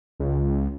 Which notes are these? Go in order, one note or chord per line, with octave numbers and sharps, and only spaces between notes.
C#2